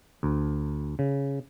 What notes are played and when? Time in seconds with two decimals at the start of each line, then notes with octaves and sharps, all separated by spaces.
0.23 D2
0.99 C#3